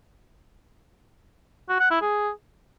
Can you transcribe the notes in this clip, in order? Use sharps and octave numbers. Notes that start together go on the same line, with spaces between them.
F#4
F#5
E4
G#4